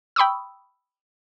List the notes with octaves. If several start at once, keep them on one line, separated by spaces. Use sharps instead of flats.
G5 B5 C#6 D#6 E6